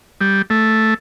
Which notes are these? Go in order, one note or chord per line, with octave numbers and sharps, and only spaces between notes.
G3
A3